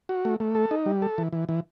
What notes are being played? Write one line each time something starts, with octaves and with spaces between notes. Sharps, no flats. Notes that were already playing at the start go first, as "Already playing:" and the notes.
F#4
A3
A3
A4
D#4
G3
A4
E3
E3
E3